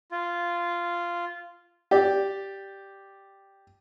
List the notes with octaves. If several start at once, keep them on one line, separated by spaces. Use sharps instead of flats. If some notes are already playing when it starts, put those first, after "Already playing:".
F4
G4 D5